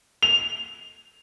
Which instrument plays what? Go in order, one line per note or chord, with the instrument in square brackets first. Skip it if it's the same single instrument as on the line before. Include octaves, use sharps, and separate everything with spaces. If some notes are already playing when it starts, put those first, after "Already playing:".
[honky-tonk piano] F7